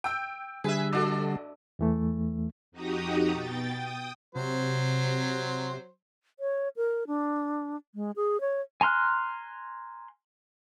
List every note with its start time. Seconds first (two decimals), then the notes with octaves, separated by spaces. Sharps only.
0.04 G5 E6 G6
0.64 D3 G3 G#4 B4 E5
0.93 A1 D4 F#4 A4
1.79 E2 E3 A3
2.72 F2 D#4 F#4 G4 A#5 D#6
3.30 B2 G5 A6
3.74 G5 D#6
4.35 C3 F#3 C5
6.40 C#5
6.76 A#4
7.07 D4
7.95 G#3
8.16 G#4
8.41 C#5
8.81 G#5 A#5 C6 F6 F#6